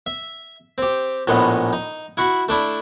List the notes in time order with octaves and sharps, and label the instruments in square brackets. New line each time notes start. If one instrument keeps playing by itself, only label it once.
[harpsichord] E5
C4 G4
A#1 A2 B3 D#5 C6 D#6
D#4
E4 F#4 F#5 B5
A3 D4 E4